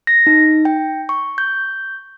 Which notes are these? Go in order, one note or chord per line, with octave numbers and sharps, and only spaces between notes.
A#6
D#4
G5
C#6
G6